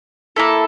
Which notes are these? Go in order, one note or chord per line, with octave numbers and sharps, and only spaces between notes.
A#3 E4 A4